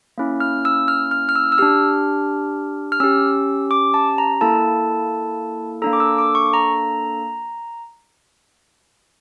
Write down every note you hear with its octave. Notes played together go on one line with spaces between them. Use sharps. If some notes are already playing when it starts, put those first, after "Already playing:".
A#3 C#4 E4
F6
E6
F6
F6
F6
E6
E6
D4 G4 F6
F6
C#4 G4 E6
D6
A5
A#5
A#3 E4 A4 A5
A#3 D4 A4 A#5
D6
E6
D6
C#6
A#5